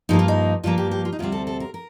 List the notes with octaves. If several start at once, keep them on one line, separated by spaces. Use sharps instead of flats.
G2 F3 A#3 D#4
F4
D#4
G2 F3 A#3 F4
G4
G4
F4
D#4
D2 C3 G3 C4 F4
A4
A4
A#4
A#4